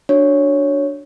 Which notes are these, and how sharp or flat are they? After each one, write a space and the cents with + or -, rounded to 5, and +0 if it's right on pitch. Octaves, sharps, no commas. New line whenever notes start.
D4 +0 F#4 +0 C#5 +0